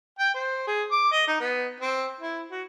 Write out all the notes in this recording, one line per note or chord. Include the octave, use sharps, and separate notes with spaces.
G5
C5
G#4
D6
D#5
D#4
B3
C4
E4
F#4